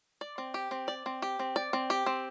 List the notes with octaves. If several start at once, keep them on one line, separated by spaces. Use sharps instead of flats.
D5
C4
G4
C4
D5
C4
G4
C4
D5
C4
G4
C4